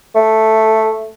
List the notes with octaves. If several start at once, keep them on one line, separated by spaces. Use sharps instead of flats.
A3